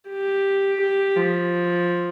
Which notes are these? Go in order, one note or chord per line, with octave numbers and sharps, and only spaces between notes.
G4
G4
F3